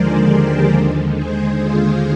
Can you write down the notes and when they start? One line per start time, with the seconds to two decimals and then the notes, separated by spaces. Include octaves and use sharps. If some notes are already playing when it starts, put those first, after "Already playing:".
Already playing: D#2 D3 F3 G#3 G#4 A#4 C5 D5
0.29 G4 A#4
0.72 D#2 D3 G#3
1.16 G#4 C5
1.60 F4 G#4